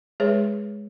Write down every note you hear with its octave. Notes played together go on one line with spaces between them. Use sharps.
G#3 G#4 B4 C#5